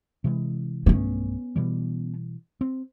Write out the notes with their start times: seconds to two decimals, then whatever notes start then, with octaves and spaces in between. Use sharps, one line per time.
0.24 C3 E3 G#3
0.86 B1 G2 A3 B3 C#4
1.56 B2 E3 G3
2.61 C4